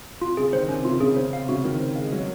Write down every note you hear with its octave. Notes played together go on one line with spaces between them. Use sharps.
C3 F4
C#3 G#4
D#3 C5
C3 C#4
C#3 F4
C#3 G#4
C#3 C5
C3 F5
C#3 F#4
D#3 F#4
C5
G#3 F5
F#3 A#4